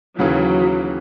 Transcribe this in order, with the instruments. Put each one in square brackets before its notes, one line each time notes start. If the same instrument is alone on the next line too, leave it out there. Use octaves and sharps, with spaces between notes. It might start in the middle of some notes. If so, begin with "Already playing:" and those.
[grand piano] D#2 C#3 E3 [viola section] F#3